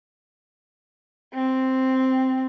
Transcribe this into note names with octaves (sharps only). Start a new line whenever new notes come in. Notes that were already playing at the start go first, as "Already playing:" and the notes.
C4